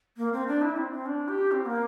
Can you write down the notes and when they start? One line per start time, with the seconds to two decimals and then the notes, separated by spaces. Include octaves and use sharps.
0.17 A#3
0.32 C4
0.47 D4
0.62 E4
0.76 C4
0.92 C4
1.06 D4
1.28 G4
1.52 C4
1.65 A#3